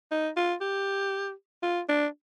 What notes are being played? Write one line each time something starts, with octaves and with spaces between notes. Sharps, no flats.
D#4
F4
G4
F4
D4